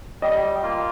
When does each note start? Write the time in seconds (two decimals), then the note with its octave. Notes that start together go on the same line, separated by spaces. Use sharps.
0.22 G3 D#5
0.63 A#3 F4